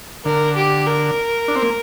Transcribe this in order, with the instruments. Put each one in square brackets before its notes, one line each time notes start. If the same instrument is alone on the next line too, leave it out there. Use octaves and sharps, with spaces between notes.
[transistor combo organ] D3 [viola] A#4
[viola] G4
A#4
[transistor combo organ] D4
C4
A#3